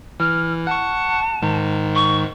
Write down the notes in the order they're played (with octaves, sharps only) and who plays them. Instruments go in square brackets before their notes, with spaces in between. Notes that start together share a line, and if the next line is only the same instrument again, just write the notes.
[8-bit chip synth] E3 [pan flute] F6
[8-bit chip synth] F#5 C#6 [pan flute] A5
[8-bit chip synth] G#2 D#3
[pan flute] C#6